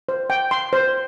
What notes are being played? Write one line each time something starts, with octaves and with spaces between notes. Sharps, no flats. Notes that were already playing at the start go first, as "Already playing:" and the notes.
C5
G5
C6
C5